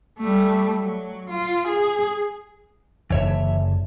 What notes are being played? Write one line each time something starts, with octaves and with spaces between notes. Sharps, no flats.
G3 A3
F#3
F4
G#4
F#1 G2 D3 E3 C#5 E5